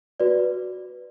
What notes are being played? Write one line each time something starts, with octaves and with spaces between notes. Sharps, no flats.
F#4 B4 D5